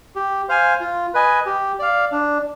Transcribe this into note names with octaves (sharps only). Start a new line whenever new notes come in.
G4
C5 F5 G#5
F4
B4 D#5 G#5
G4
D5 F5
D4